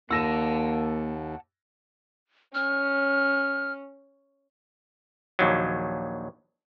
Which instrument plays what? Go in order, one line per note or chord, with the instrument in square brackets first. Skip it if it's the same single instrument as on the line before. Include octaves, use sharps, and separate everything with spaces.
[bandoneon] D#2 [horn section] A#3 [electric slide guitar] F#5 A5 [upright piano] E6 A#6 E7
[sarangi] C#4 [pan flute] F6
[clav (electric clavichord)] A#1 D#2 F#3